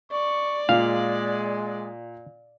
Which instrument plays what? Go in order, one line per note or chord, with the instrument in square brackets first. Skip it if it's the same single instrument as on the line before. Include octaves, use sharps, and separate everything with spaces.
[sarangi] D5 [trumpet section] C#6
[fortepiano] A#2 [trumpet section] G#3 [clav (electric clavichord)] F5